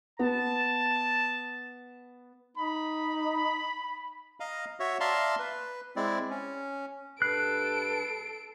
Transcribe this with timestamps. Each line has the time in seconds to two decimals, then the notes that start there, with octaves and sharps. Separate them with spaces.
0.19 B3 A5
2.57 D#4 B5
4.40 D#5 F5 A#5
4.80 F#4 C#5 E5
5.00 D5 E5 F5 A5 A#5 C6
5.39 B4
5.96 G#3 C4 E4 D5
6.30 C#4
7.22 G2 A4 B4 F#6 C7 D7